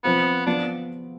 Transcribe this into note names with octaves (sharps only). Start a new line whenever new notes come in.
F3 B3 C4 F4
F3 B3 D4 F4